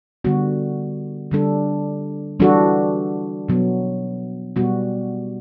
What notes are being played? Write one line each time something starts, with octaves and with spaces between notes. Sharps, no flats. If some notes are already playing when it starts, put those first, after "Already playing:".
D3 G3 B3 F#4
D3 G3 D4 A4
E3 G3 D4 F#4 A4
B2 F#3 B3
B2 G3 B3 F#4